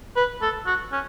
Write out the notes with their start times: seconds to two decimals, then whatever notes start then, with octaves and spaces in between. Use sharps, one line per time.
0.16 B4
0.42 A4
0.66 F#4
0.92 C#4